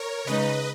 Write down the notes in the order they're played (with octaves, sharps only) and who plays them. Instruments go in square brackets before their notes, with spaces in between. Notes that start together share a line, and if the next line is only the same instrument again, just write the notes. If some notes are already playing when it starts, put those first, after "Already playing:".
Already playing: [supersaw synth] A#4 C#5
[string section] C#3 G#3 D#4 [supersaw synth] B4 D#5